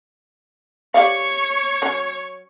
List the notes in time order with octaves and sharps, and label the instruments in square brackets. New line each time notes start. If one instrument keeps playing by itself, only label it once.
[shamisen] G4 D5 F5 [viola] C#5 C#6
[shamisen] F#3 C#4